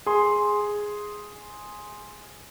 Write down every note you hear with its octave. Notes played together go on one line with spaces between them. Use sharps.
G#4 C6